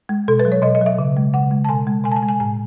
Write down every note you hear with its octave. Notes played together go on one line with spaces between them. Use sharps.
G#3
B2 A4
B4
F#3
C#5
B2 D#5
D#5
F#3
E5
C#3
G#3
C#3 F#5
G#3
A5
B2 G#5
G#3
B2 G#5
A5
G#5
G#3
G#5
A2 G#5